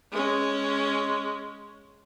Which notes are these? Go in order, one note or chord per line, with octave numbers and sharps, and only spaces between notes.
G#3 C#4